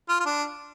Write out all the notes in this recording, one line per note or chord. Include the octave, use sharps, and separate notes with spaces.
F4
F4
D4